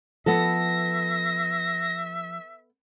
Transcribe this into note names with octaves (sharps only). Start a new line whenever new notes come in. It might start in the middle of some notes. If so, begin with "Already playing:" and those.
F3 B3 A4 E5 A#6